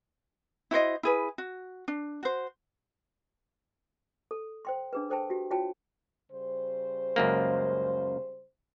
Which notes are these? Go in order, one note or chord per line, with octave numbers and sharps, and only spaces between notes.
E4 F#4 C5 D#5
E4 G#4 B4
F#4
D4
F#4 C5
A4
C5 G5 C6
D4 G#4 B4
A4 C5 G5 A5
F#4 G4
F4 F#4 C#5 G5 A5
C#3 G3 C5
C#2 F#2 A#3